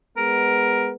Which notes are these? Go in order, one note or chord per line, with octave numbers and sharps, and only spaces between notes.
G#3 B3 A#4